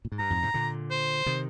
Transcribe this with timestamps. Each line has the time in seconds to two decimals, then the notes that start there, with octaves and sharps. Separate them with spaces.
0.05 A#2
0.12 G#2
0.19 G2 A#5
0.30 F2 G#2
0.42 G#2 C3
0.54 A#2 D3
0.91 C5
1.26 C3 D#3